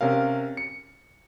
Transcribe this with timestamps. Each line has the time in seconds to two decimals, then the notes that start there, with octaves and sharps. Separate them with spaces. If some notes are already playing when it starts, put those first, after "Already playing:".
0.01 C3 C#4 A#4 F5
0.57 C#7